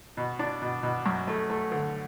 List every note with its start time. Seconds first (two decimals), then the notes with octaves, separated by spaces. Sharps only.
0.17 B2
0.39 D4
0.62 B2
0.83 B2
1.06 F#2
1.27 A3
1.50 A3
1.71 D3